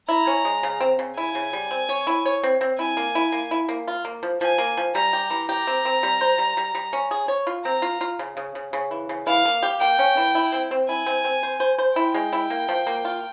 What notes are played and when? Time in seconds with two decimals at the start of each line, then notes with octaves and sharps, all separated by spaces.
0.08 E4 A#5
0.27 C#4
0.45 G#3
0.63 C#3
0.80 C4
0.99 C#3
1.17 E4 G#5
1.35 C#3
1.53 G3
1.71 C4
1.89 C#5
2.07 E4
2.25 C#5
2.43 C4
2.61 C4
2.79 E4 G#5
2.97 A#3
3.15 E4
3.32 A#3
3.51 E4
3.69 A#3
3.88 F4
4.05 A#3
4.23 F3
4.41 F3 G#5
4.58 A#3
4.77 F3
4.95 G3 A#5
5.13 G4
5.30 E3
5.49 G4 A#5
5.67 C4
5.85 C4
6.03 G3
6.21 C5
6.38 G3
6.57 G3
6.75 G3
6.93 C#4
7.11 G#4
7.28 C#5
7.47 F4
7.65 C4 A#5
7.82 F4
8.01 F4
8.19 C#3
8.37 C#3
8.55 C#3
8.73 C#3
8.91 E3
9.09 C#3
9.27 E3 F5
9.45 A#3
9.63 G4
9.81 A#3 G5
9.99 C#4
10.17 E3
10.35 E4
10.52 C4
10.71 C4
10.89 E4 G#5
11.06 C4
11.24 C4
11.43 C5
11.60 C5
11.78 C5
11.96 E4 G5
12.14 G#3
12.33 E4
12.50 A#3
12.69 F3
12.87 A#3
13.05 F4